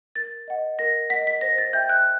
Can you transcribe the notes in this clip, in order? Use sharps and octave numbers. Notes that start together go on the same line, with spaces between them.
A#4 A6
D#5 F#5
A#4 A#6
D#5 F#5 B6
B6
C5 A#6
A6
E5 G5 G6
F#6